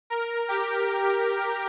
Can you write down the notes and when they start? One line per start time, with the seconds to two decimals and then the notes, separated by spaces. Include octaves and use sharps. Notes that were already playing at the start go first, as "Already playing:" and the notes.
0.10 A#4
0.48 G4